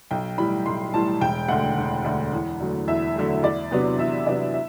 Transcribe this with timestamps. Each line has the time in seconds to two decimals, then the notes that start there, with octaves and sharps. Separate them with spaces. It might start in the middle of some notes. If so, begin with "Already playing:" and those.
0.11 B1 G5
0.38 A2 E3 G3 B5
0.66 B1 C6
0.94 A2 E3 G3 A5
1.21 E1 G5
1.48 D2 D3 F#5
1.77 E1
2.05 D2 D3
2.33 E2
2.60 D3 F#3 A3
2.88 E2 E5
3.16 D3 F#3 A3
3.43 E2 D5
3.71 C3 F#3 B3 D4
3.98 E2 E5
4.26 C3 F#3 B3 D4 D5
4.54 E5